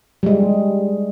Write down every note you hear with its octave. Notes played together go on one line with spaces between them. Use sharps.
G3 G#3